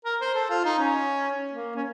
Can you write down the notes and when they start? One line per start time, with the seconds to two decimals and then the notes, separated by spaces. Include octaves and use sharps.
0.05 A#4
0.21 C5
0.35 A4
0.50 F4
0.65 D#4
0.79 C#4
1.53 A#3
1.76 C#4